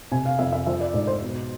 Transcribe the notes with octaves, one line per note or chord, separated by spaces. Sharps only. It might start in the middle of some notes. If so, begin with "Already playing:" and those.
C3 G#5
F5
F2 E5
E5
F3 E5
D5
G#2 D5
C5
B2